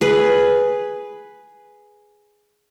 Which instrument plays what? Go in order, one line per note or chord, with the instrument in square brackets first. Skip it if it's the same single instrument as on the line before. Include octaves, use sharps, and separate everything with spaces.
[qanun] G#4 B4